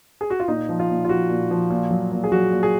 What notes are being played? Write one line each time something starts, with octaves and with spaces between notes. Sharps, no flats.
G#4
F#4
F4
A#2 D#4
F3
F4
A#2
F4
F3 F#4
A#2
F3
A#2
F#3
A#2
G#4
F#3 F#4
A#2
G#4